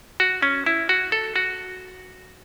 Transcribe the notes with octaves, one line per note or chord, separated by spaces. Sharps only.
F#4
C#4
E4
F#4
A4
F#4